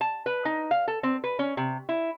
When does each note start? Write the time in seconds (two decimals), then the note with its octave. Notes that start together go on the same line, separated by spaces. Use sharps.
0.01 A5
0.26 B4
0.45 D#4
0.71 F5
0.88 A4
1.03 C4
1.24 B4
1.39 C#4
1.57 C3
1.89 E4